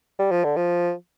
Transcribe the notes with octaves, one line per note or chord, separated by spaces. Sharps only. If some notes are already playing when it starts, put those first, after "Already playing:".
G3
F3
D3
F3